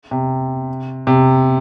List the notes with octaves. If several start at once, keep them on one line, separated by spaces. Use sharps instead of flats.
C3
C3